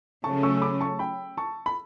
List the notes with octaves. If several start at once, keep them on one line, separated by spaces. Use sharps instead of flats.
C#3 F#3 A3 C#4 A5 C#6
C#6 E6
E6
B5 D6
A5 C#6
G5 B5
A5 C#6
B5